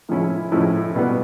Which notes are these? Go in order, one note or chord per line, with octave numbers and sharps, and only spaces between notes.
A2 F3 G#3 C#4 E4
A2 F3 G#3 C#4 E4
B2 G3 B3